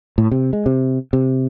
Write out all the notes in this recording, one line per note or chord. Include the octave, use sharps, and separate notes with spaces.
A2
C3
G#3
C3
C3